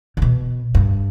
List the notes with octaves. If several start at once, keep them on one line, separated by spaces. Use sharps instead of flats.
C#3
B2
G2